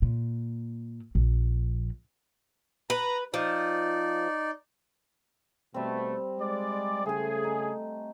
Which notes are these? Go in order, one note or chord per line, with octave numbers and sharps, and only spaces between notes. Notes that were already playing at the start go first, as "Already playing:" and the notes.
A#2
A#1
B4 A#5
F3 D#4 D5
B2 G3 A3 C4
G#3 D5
C#3 A3 G#4 G#5
D#4